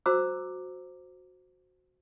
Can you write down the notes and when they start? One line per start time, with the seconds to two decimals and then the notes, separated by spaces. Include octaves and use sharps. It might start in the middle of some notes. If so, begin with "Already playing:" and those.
0.06 F#4 C5 A#5 D6 E6